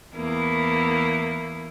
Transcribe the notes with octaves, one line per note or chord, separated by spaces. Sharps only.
E2 A#3 E4